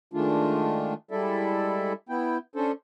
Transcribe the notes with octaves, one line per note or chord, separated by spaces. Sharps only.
D#3 G#3 A3 D4 F4
G3 G#3 E4 A4 D5 E5
B3 E4 G5
C#4 D4 A4 C5